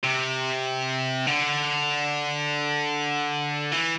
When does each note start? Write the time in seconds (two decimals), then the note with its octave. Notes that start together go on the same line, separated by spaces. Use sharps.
0.04 C3
1.27 D3
3.73 E3